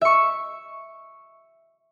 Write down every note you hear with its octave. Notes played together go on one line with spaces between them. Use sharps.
E5 C#6